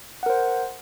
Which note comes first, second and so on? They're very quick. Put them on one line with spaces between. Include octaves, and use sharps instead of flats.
F#5 A#4 C5